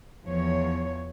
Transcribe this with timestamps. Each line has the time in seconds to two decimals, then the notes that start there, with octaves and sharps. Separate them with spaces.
0.24 E2 F3 C#5